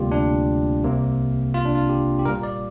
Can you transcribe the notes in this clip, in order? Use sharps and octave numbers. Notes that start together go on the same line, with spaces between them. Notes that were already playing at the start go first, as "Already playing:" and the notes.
Already playing: D2 C3 G3 A#3 F4 G4
D4
C2 C3 A#3
F4
D4
F4
G4
G4
A#2 G3 A#3 A#4
D5